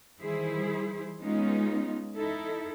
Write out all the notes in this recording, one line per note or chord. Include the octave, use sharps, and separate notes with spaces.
D#3 E3 G3 E4 G#4 C5
G#3 B3 C#4 D#4 F4
D#4 E4 A4